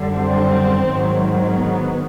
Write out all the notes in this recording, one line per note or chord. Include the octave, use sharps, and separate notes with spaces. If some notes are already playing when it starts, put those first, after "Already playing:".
Already playing: F#2 D3 G3
C4
G#2 D#3 F#3
B3